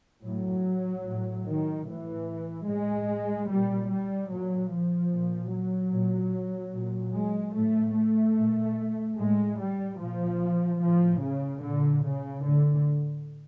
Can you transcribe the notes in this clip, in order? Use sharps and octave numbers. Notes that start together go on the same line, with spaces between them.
A2 F#3
A2
D#3
A2 E3
A2 G#3
A#2 G3
G3
A#2 F#3
F3
A#2
F#3
A#2
A#2
G#3
A2 A3
A3
A#2
A2 G#3
G3
A#2 F3
A2 F3
C#3
A#2 D3
C#3
A2 D3